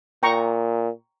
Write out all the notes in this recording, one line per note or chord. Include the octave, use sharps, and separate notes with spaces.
A#2 G5 A#5 C#6